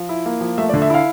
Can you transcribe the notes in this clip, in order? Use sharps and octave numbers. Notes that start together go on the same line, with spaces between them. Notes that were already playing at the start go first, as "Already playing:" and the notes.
Already playing: F3
E4
A#3
F3
A3 E5
D5
D3
E5
E4 F5